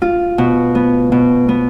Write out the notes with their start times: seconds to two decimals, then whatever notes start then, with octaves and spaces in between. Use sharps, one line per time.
0.02 F4
0.38 B2
0.75 B3
1.12 B2
1.49 B3